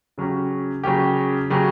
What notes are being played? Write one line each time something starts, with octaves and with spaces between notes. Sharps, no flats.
C#3 F#3 C#4 G4
C#3 F#3 C#4 G4
C#3 F#3 C#4 G4